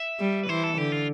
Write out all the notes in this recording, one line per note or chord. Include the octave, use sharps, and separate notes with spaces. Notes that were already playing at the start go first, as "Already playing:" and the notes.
Already playing: E5
G3
B4
E3 C5
A4
D3 G4
F4